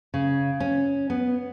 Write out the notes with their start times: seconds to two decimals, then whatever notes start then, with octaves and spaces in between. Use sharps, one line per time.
0.14 C#3
0.60 C#4
1.10 B3